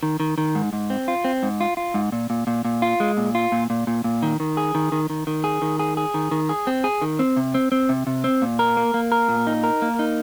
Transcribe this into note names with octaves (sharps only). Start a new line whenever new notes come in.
D#3
D#3
D#3
G#2
G#2
C4
F4
C4
G#2
F4
F4
G#2
A#2
A#2
A#2
A#2
F4
G#3
A#2
F4
A#2
A#2
A#2
A#2
D#3
D#3
G#4
D#3
D#3
D#3
D#3
G#4
D#3
G#4
G#4
D#3
D#3
G#4
C4
G#4
D#3
C4
C3
C4
C4
C3
C3
C4
A#2
A#4
A#3
A#3
A#4
A#2
D#4
A#4
A#3
D#4